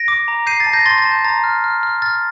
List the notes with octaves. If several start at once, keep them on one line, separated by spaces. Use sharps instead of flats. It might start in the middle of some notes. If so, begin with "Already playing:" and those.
Already playing: A#6 D7
D6
A#5
G6 C7 D#7
A6 C7
A5
G6 A#6
C6 A6
A6
A5
G6
A#5 A6
F6
F6
F6
F6 A6